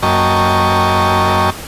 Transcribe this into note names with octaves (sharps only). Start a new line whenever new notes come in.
F#2 A#3 D#5 G5 A5 C#6